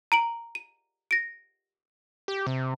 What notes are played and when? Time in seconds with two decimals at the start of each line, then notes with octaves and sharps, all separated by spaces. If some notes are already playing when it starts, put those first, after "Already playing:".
0.12 A#5 D7 F#7
0.55 D#7
1.11 A#6 D7
2.28 G4
2.47 C3